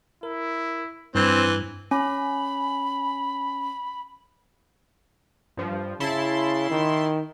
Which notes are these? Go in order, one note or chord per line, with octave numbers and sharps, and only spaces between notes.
E4 A#4
G2 E3 C4 C5
C#4 B5
G2 F3
C#3 E4 A5 C6
D#3